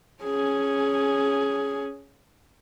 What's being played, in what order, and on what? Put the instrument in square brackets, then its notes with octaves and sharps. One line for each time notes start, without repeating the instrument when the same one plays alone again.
[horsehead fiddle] C#4 G#4